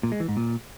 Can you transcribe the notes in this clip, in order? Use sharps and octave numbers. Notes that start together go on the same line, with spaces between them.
A#2
G#3
E3
G#2
A#2